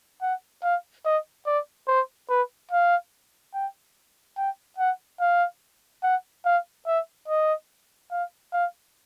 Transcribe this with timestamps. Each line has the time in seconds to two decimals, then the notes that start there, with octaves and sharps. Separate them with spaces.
0.22 F#5
0.63 F5
1.05 D#5
1.46 D5
1.88 C5
2.30 B4
2.71 F5
3.54 G5
4.38 G5
4.78 F#5
5.20 F5
6.03 F#5
6.45 F5
6.87 E5
7.28 D#5
8.11 F5
8.53 F5